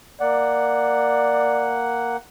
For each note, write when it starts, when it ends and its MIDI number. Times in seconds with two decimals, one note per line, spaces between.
0.21 2.17 58
0.21 1.81 74
0.21 2.17 78